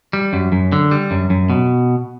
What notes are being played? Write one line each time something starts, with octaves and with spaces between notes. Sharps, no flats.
G3
F#2
F#2
D3
G3
F#2
F#2
B2